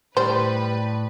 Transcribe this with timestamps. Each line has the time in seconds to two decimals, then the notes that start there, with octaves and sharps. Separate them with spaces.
0.17 A2 G3 B4 C5